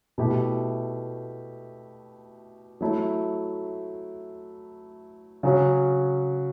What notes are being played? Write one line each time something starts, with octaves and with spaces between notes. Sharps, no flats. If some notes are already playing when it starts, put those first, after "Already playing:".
B2 A3 E4 G4
F#3 A3 E4
C#3 F#3 C#4 F#4